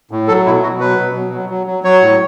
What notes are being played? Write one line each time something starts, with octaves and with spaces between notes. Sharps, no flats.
A2
F#3 A4
B2 E4
B2 F#4
F#3 B4
B2
F#3
F#3
F#3
F#3
F#3 C#5
A2